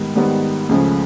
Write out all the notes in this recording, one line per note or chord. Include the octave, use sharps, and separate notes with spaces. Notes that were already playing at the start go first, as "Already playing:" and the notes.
Already playing: G#2 D#3 G3 B3
G#2 D#3 G3 B3
C#2 C#3 F3 A3